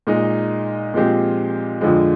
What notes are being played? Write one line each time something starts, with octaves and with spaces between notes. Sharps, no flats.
A#2 G#3 D#4
A#2 F3 G#3 C4 G4
F2 D3 F3 G#3